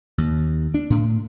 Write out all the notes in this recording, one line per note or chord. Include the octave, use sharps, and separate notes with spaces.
D#2
D4
A2